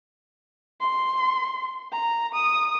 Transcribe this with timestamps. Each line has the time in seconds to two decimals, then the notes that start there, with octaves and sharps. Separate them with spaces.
0.81 C6
1.92 A#5
2.34 D#6